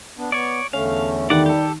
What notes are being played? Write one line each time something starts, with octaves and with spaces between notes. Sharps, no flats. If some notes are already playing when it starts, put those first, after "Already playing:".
B3 D4
B3 C#5 D5
E2 D3 A3 C#4 F5
D#3 G3 D5 F#5
G4 A4